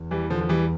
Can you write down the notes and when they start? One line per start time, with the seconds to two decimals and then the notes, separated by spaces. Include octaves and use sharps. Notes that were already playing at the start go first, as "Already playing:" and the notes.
Already playing: E2
0.11 E3 G3
0.30 D3 F3
0.41 F3
0.49 E3 G3